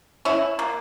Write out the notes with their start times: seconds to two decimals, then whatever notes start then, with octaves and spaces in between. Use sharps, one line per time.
0.25 C#4 E4
0.59 A#3